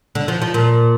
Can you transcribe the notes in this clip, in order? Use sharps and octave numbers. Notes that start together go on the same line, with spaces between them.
D3
F3
F3
A#2